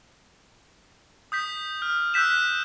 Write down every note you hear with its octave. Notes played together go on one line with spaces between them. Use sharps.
D#6 G6 B6
F6
E6 F#6 G6 B6 E7